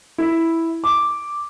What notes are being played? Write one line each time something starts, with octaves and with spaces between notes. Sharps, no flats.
E4
D6